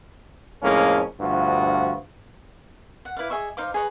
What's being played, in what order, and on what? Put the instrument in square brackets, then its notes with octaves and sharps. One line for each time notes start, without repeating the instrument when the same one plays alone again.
[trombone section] F2 A2 G#3 A#3 C#4
D2 G2 F3 F4 F#4
[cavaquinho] F#5
E4 B4 D5 F5
G#4 D#5 E5 C#6
D#4 C5 F5 D6
G#4 B4 C#5 D#5